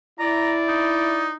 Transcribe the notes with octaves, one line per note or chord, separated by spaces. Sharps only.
E4 D5 A#5
D#4